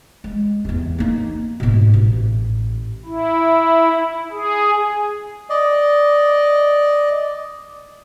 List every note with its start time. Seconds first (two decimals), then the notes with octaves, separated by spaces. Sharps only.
0.24 G#3
0.65 E1 E2
0.98 A#3 D#4
1.60 G#2 B2
1.94 A1
3.06 E4
4.32 G#4
5.50 D5 D#5